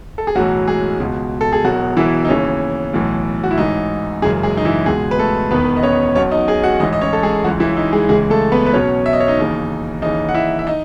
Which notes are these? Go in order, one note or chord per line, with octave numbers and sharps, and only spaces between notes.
A4
G#4
B1 A2 E3 F#3 F#4
G#3 G#4
C#2 B2
A4
G#4
E1 E2 B2 F#3 F#4
E3 E4
D#4
D#2 C#3 E3 C#4
B1 A2 E3
F#4
E4
A1 G#2 E3 D#4
F#1 F#2 C#3 E3 G#3 G#4
G#3 G#4
D#4
E3 E4
C#2 B2 G#3 G#4
B4
A3 A4
E1 E2 D#3 B3 B4
D#5
C#4 C#5
B1 B2 C#4 C#5
D#4 D#5
G#4 G#5
F#4 F#5
A1 G#2 E3 D#4 D#5
D#5
C#4 C#5
A4
G#3 G#4
C#2 C#3 E3 F#3 F#4
E3 E4
D#4
G#3 G#4
C#2 C#3 E3 G#3 G#4
A3 A4
B3 B4
B4
B1 B2 C#4 C#5
E5
D#5
C#5
D#4 D#5
D#2 C#3 E3
D#2 C#3 E3 D#4 D#5
F#5
E4 E5
E5
D#4 D#5